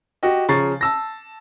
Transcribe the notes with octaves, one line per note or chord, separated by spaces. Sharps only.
F#4 G4 D#5
C#3 F3 A#5 C#6 A6 C7
A5 E6 A#6